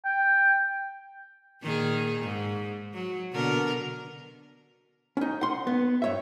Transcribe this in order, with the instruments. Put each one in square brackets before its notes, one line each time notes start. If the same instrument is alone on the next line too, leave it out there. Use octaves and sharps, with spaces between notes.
[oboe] G5
[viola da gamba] A#2 D#3 G#4
G#2
F#3
B2 D3 A#4
[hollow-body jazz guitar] C#4 D#4
F#5 C6
B3
G2 C#5 E5